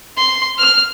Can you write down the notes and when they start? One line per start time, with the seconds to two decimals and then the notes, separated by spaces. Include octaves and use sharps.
0.17 C6
0.58 F6